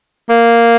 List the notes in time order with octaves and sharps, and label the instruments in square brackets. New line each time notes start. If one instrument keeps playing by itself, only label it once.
[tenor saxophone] A#3